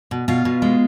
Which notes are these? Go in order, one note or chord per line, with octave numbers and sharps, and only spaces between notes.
B2
B2 F4 F5
B2
G#3